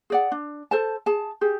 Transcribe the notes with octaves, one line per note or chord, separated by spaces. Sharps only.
G#4 D5 F#5
D4
A4 C5 A5
G#4 A5
G4 G#4